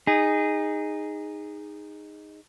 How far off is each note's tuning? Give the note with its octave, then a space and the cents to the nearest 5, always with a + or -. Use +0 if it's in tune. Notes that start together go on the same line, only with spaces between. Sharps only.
D#4 +0 G#4 -20